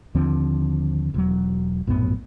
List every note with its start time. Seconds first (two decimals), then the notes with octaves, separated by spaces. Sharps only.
0.15 D#2 D3 F3 C4
1.14 E1 F#3
1.87 A#1 F#2 A2 B3